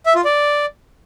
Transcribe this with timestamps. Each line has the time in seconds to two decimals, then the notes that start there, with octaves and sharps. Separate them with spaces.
0.06 E5
0.15 F4
0.25 D5